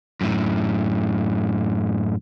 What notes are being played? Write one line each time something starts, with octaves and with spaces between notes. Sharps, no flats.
F#2 A2